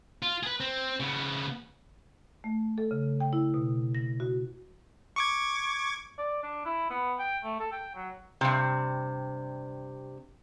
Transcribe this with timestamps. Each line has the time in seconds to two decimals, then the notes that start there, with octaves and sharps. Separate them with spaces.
0.22 F4
0.43 G#4 B4
0.60 C4
1.00 C#3 B3
2.44 A3
2.78 A4
2.91 C#3
3.20 G5
3.33 E4
3.54 B2
3.95 A#6
4.20 F#4
5.16 C#6 D6 G#6
6.18 D5
6.43 D4
6.65 E4
6.90 B3
7.19 G5
7.44 A3
7.60 A4
7.72 G5
7.95 F#3
8.41 G2 C3